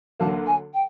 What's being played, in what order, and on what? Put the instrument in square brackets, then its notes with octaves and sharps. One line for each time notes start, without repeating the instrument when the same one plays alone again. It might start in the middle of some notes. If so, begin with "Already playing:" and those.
[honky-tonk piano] D2 D3 F#3 A#3 [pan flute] A5
[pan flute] G#5
G5